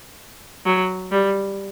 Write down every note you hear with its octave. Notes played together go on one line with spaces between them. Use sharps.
F#3
G3